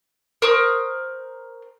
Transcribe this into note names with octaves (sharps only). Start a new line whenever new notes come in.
A#4 C5 C#6 D#6